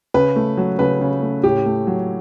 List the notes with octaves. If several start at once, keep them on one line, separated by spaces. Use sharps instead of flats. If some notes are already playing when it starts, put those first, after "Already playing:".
C#3 B4
A3
F#3
C#3 B4
C#3
A3
A2 G4
A3
F#3